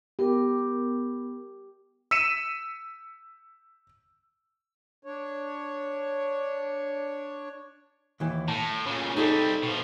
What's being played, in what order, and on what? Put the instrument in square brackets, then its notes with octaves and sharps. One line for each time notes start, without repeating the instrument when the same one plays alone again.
[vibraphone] B3 A#4 [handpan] G4
[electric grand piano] E6 B6 C#7 D#7 E7
[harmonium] D4 C#5
[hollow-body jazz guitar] D#2 E3
[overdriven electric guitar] A2 [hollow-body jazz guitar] A5
[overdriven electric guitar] A#2 C#3
[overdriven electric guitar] C3 G3 [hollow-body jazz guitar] D#4 G#4 A4
[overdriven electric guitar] B2 F3